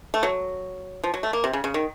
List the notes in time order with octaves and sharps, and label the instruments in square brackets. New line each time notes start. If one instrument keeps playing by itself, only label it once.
[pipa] A3
F#3
F3
F#3
A3
A#3
C3
C#3
C#3
D#3